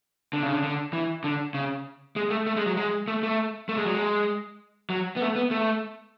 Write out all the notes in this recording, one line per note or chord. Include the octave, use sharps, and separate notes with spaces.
D3
C#3
D3
D3
E3
D3
C#3
G#3
A3
A3
G#3
F#3
G#3
A3
A3
A3
G#3
F#3
G#3
F#3
B3
A3
B3
A3